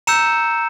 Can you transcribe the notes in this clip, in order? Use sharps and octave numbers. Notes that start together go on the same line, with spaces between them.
A#5 E6 G6 C#7 E7